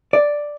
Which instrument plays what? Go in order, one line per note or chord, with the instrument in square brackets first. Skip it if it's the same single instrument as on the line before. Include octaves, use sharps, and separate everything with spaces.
[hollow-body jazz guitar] D5